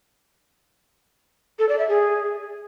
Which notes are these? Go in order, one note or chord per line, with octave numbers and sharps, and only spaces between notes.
A4
D5
E5
G#4